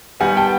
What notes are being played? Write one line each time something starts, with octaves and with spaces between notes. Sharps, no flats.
D#3 G3 B3 F#5 G#5
G5 A5